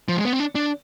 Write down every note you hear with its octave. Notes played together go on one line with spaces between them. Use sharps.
F3
G#3
B3
C4
D4
D4